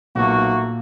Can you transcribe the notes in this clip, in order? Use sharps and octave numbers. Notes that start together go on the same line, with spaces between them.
B1 A#2 A3 A#3 F#4